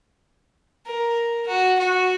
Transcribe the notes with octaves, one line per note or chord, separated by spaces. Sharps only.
A#4
F#4
F#4